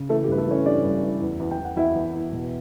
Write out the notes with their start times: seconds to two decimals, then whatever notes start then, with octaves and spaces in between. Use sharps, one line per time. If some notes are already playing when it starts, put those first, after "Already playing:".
Already playing: C#3
0.09 E3 A3 A4
0.24 G4
0.28 G2 B4
0.38 A3 A4
0.47 E3 C#4 C#5
0.66 G3 D4 D5
0.84 G2
1.03 E3
1.21 E2
1.40 E2
1.51 G5
1.58 E2
1.64 F#5
1.76 E2 E4 E5
1.95 E2
2.14 E2
2.33 B2